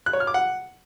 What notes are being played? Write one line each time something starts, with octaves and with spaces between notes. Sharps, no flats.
F#6
C#5
F6
D6
F#5